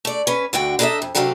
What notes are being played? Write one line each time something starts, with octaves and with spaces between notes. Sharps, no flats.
A3 D5
C#4 B4
D2 D3 F#4 G5
D4 D#4 A4 C5 D#5 E5
F2
C3 F#3 A3 D4 C#5 F5